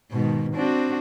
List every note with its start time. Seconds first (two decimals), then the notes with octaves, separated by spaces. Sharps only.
0.11 G#2 B2 D#3
0.55 C4 D4 F#4